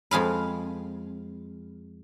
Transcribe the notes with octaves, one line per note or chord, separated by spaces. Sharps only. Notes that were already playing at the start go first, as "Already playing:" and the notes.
F2 G#3 F5 B5